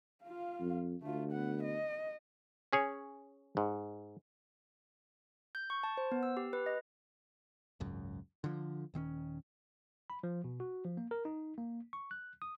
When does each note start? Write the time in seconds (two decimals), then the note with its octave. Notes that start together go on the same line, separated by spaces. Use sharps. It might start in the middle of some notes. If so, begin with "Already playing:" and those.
0.24 F4 F5
0.60 F2
1.02 D2 A3 F4
1.32 B3 F#5
1.64 D#5
2.73 C#4 G#4 C#5
3.57 G#2
5.55 G6
5.70 C#6
5.83 A5
5.97 C5
6.12 B3
6.23 E6
6.37 G4
6.53 B4
6.66 D#5
7.80 G#1 C#2 F#2
8.44 D3 F3
8.94 D#1 D#3 C4 C#4
10.10 B5
10.23 F3
10.44 B2
10.60 F#4
10.85 F3
10.97 A#3
11.11 A#4
11.25 D#4
11.58 A#3
11.93 C#6
12.11 F#6
12.42 D#6